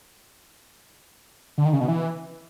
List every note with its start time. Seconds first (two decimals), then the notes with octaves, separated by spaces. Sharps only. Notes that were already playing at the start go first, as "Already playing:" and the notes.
1.58 D3
1.65 D#3
1.73 C#3
1.81 B2
1.88 E3